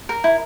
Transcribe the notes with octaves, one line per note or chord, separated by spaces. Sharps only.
A#4
E4